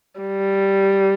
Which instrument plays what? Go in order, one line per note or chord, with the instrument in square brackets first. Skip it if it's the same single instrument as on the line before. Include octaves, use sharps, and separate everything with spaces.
[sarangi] G3